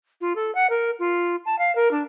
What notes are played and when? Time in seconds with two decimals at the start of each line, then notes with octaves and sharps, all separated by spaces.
0.21 F4
0.36 A4
0.55 F#5
0.70 A#4
0.99 F4
1.46 A5
1.59 F5
1.75 A#4
1.91 D4